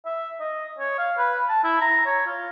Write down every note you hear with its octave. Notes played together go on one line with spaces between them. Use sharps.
E5
D#5
C#5
F5
B4
A5
E4
A#5
C#5
F4